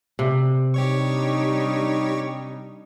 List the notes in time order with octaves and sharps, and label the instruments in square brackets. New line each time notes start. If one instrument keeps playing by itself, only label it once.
[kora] C3
[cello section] G3 D4 D#4 [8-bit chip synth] G4 C#5 C#6